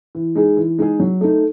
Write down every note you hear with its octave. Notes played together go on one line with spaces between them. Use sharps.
E3
G#3 D#4 G#4
E3
G#3 D#4 G#4
F#3
A3 D#4